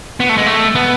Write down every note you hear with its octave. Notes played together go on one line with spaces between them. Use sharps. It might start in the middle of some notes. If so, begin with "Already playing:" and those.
B3
A3
G#3
A3
B3